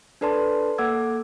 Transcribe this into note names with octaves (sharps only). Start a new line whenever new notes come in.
D4 A4 B4 D5 A5 C6
A#3 A4 F#5 D6 E6 G#6